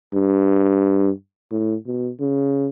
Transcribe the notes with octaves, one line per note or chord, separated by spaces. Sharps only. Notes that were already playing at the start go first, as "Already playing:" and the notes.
G2
A2
B2
C#3